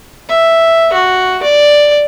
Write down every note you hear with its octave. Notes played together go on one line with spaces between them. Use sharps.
E5
F#4
D5